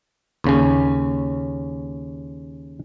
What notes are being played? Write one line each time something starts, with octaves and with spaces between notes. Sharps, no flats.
D#2 C#3 C#4